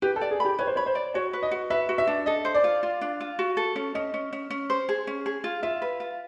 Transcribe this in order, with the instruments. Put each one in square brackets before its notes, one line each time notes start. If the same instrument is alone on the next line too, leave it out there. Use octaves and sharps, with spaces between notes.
[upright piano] G4 [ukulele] B4
[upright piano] A4
[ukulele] D5
[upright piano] G#4
[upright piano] G4 [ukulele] B5
[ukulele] B4 [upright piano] C#5
[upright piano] C5
[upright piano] C#5 [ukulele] B5
[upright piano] C5
[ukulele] D5
[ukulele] F#4 [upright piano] C#5
[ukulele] B4
[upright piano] D#5
[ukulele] F#4
[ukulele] B4 [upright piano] E5
[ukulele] F#4
[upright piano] E5
[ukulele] D4
[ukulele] A4 [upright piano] D#5
[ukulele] C5
[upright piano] D5
[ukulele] F4
F4
D4
F4
F#4
A4
C#4
[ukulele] C#4 [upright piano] D#5
[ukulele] C#4
C#4
C#4
C5
G#4
C#4
G#4
F4
[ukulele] F4 [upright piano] E5
[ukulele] B4
F4